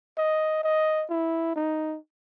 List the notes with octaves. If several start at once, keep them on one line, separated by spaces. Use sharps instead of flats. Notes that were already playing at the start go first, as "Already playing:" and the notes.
D#5
D#5
E4
D#4